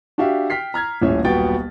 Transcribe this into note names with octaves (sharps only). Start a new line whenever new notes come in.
D4 F#4 G4 E5 F5
G5 F6 B6 C7
A#5 F6 G#6
D#1 A1 C#4 E5
D#1 B1 B2 B3 G5 A6